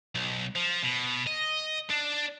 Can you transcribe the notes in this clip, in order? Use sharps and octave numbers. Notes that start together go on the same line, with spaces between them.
B1
F3
B2
D#5
D4